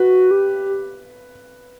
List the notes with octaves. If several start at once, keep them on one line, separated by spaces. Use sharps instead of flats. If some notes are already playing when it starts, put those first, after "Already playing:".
Already playing: F#4 B4
G4